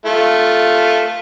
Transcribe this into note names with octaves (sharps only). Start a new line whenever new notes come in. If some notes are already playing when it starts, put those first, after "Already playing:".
A3 F4